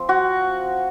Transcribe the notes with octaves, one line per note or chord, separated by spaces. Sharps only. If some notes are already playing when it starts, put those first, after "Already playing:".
Already playing: F3 C4
F#4